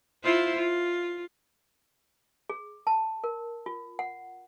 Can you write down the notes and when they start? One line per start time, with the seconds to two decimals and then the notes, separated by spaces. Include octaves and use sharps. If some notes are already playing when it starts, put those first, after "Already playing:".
0.23 E4 F4 C5
0.56 F4
2.50 G#4
2.87 A5
3.24 A#4
3.66 F4
3.99 F#5